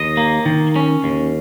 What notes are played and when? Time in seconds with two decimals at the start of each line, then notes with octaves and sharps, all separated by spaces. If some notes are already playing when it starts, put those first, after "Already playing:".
Already playing: D#2 D#5
0.17 A#3
0.46 D#3
0.76 C#4
1.04 D#2